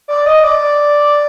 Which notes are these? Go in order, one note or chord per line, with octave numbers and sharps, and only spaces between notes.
D5
D#5
D5